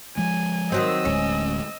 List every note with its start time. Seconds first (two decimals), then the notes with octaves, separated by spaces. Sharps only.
0.17 F3 G#3 G#5
0.72 D#3 F#3 C4 D#5 E6
1.05 D1 D2 G#3 C#4